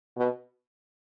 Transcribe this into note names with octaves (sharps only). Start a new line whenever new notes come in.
B2